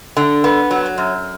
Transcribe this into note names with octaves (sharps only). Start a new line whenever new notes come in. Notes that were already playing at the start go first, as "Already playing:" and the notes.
D3
B3
F#3
F#2